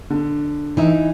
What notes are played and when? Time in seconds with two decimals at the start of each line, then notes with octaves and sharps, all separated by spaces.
0.10 D3
0.77 E3 D#4 E5